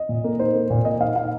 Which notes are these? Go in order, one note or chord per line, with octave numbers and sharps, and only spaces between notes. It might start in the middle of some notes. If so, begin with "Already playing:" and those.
Already playing: D#5
A#2
A#3
D#4 C5
A#3
A#2
A#3 D#5
D#4 F5
D#4 F5